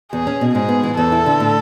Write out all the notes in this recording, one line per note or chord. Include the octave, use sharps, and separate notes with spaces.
E2 G#4
C#4
B2
G#2 G#4
B3
E3
E2 A4
E4
D3
A2